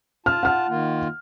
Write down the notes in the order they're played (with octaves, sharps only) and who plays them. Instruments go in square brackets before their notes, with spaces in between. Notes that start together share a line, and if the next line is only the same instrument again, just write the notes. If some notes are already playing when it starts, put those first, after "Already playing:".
[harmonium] F4 A5 [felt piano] F6
[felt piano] F#5 F6
[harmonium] D#3 A#3 F4